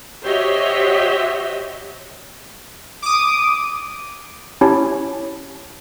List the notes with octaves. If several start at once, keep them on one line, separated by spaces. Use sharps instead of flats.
F#4 G4 C5 C#5 D#5 E5
D6 D#6
C#4 E4 G4 C#5 A5